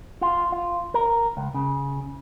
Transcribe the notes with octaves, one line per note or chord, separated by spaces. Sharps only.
F4
F4
A#4
C#2
C#3